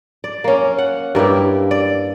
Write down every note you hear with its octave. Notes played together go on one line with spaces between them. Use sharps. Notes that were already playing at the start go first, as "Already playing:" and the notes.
D5
A#3 C#4
F#5
G2 A#3 E4 G4
D5